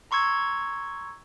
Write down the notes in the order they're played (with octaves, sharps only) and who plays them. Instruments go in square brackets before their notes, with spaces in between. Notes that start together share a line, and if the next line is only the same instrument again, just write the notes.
[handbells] A#5 C6 C#6 E6 G#6